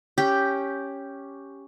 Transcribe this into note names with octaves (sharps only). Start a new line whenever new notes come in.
C#4 G4